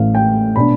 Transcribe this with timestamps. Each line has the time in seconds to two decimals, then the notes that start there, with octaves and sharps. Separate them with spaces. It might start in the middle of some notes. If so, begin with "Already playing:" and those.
Already playing: A1 A2 E3 F5
0.15 G5
0.56 B2 B3 D4 B5